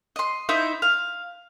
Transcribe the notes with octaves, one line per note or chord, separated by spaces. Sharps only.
D#5 C6
D#4 E4 C5 E5
F5